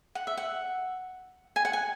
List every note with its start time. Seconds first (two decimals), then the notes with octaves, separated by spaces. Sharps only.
0.15 F#5
0.27 E5
0.37 F#5
1.56 G#5
1.65 F#5
1.73 G#5